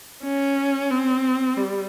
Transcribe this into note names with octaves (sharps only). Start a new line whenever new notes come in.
C#4
C4
G3